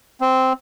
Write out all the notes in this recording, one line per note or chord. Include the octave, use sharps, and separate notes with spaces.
C4